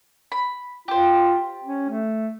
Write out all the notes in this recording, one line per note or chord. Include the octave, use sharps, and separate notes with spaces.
B5
F4 G4 C5
C#4
A3